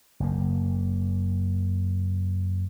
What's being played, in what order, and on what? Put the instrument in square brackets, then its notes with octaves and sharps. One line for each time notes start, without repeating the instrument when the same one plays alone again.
[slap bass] F#1 A#3